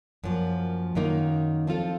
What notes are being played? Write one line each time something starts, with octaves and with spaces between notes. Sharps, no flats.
F#2 F3 A#3
F#2 D#3 A#3 D#4
F3 C4 F4 A4